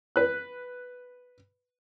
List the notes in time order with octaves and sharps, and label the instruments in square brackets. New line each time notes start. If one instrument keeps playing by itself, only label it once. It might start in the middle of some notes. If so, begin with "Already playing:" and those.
[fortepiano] B4 F#6